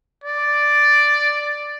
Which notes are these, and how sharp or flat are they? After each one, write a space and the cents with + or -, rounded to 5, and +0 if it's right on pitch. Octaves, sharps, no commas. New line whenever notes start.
D5 +0